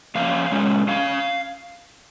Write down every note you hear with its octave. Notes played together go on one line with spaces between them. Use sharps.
G2 F3 A#3 C#4 F5
A#2 G#3 C#4
G3 C#4 F5